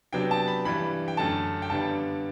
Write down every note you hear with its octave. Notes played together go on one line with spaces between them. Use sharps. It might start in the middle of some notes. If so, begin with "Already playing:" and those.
C3 F#3 B3 D4 G5
A5
B5
G2 E3 G3 B5
G5
F#2 D3 A3 A5
G5
G2 D3 G3 B3 D4 A5